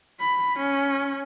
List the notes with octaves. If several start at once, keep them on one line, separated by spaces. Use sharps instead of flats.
B5
C#4